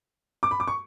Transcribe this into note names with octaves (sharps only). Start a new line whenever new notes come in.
D6
B5
D6
C#6